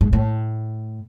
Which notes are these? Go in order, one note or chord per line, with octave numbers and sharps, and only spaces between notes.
G#2
A2